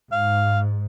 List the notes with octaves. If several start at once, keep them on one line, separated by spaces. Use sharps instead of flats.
G#2 F5